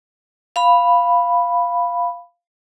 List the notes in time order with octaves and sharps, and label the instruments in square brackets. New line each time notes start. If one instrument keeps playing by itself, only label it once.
[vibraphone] F5 B5